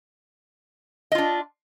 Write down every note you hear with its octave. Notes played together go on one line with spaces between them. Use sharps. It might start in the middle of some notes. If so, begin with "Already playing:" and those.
D4 F4 D#5